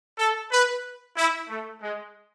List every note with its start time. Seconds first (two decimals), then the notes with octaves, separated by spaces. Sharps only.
0.18 A4
0.51 B4
1.16 E4
1.49 A3
1.81 G#3